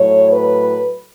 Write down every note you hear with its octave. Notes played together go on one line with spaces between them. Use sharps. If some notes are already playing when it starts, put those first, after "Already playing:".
Already playing: A2 F#3 C#5
B4